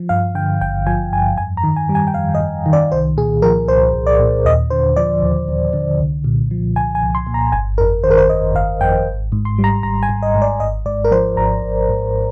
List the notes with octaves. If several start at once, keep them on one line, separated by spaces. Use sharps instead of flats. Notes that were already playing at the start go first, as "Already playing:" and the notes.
Already playing: F3
G2 F5
D3 G5
G#1 G5
F3 G#5
G2 G#5
F2 G#5
A#5
D#3
G#5
G3
G#5
G5
F2 F5
D#5
F2
D#3
D5
C2 C5
A#2 G#4
F3 A#4
C2 C5
C2
D5
A#2
D#2 D#5
D3 C5
F3 D5
D#2
D#2
D3
C2
A#2
F3
C2 G#5
G#5
C2
C6
A#2
A#5
G1 G#5
F2 A#4
D#3 C5
A#4
C5
G1 D#5
G1 F5
F2 G5
G#1
G#2
C6
G3
A#5
G#1 A#5
G#5
G#1
D#5
G#2
D5
G#1 D#5
G#2 D5
A#4
F3 C5
G#1 A#5
G#1
G#2